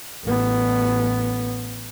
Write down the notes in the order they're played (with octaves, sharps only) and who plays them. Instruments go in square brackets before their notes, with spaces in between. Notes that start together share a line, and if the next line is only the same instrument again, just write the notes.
[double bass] A1 B3